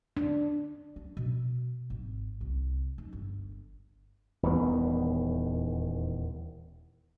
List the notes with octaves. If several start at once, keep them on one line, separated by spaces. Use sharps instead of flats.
D4
D4
B2
G#1
C2
D#4
G1
D#1 E2 D#3 B3